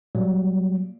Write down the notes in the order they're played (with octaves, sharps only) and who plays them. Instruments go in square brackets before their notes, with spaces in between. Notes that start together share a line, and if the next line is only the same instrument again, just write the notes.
[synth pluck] A#2 [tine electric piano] F#3 G3